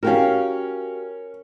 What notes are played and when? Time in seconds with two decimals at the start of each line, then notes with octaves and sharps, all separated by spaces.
0.03 C#4 F#4 G4 A#4 F5